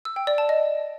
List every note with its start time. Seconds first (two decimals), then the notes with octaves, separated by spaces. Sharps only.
0.05 E6
0.16 G5
0.27 D5
0.38 A5
0.49 D#5